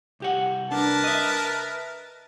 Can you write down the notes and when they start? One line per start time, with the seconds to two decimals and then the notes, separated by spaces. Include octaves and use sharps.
0.20 C2 G4 F#5
0.71 C2 D4 A#4 B4 A5
1.04 D#5 E5